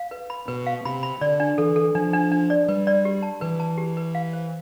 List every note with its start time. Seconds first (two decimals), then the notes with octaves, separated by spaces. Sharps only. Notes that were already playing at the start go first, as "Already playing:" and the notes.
Already playing: F5
0.11 B4
0.30 B5
0.48 B2 B4
0.66 F5
0.85 C3 B5
1.03 B5
1.21 D3 D5
1.40 D4
1.58 E3 A4
1.76 A4
1.95 F3 D4
2.14 D4
2.32 D4
2.50 D5
2.68 G3 B4
2.87 D5
3.05 G4
3.23 A5
3.41 E3 B4
3.60 A5
3.78 G4
3.97 B4
4.15 F5
4.33 C5